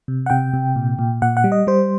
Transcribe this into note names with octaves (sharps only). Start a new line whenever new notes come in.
C3
F#5
C3 G5
C3
A#2
A#2
A#2 F#5
F#5
G3
D#5
G3 C5